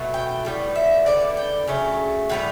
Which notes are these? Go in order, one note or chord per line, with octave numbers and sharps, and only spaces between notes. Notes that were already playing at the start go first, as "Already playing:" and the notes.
Already playing: B2 F#3 A3
G5
A2 G3 B3
E5
D3 G3 B3 D5
G5
C#3 F#3 A3
A2 G3 B3 F#5